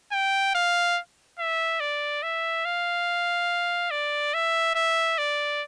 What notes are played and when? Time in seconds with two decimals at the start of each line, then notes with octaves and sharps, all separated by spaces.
0.12 G5
0.55 F5
1.39 E5
1.80 D5
2.23 E5
2.65 F5
3.91 D5
4.34 E5
4.75 E5
5.18 D5